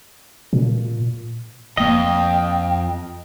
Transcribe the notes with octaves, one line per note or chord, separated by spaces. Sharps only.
A#2
F2 A#3 D#5 G5